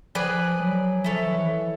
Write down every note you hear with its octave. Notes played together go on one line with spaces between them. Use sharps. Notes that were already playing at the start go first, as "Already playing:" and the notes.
F3 G#4 B4 D5
F#3
F3 E4 A4 C#5
E3